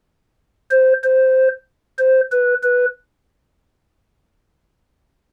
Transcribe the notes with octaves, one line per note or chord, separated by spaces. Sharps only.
C5
C5
C5
B4
B4